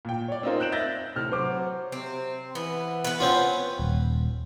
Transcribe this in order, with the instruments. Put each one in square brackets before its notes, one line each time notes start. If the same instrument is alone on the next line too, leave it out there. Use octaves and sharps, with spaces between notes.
[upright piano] A#2 G5
C#5 D5
C4 C#4 D#4 F4 A#4 C5
F#6 G6 D7 E7 F#7
E5 G6 A6 A#6
[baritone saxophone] A2 [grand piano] C3 F6
[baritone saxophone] F#3 [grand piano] C5 D6
[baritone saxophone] C3 [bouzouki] C4
[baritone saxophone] E3 [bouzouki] B3
[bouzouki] B3 B4
[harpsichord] C4 C#4 F4
[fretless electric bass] D#1